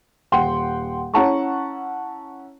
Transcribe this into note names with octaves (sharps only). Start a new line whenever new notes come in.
D#1 F#5 G5 C6
C#4 E4 F#5 A5 A#5 C#6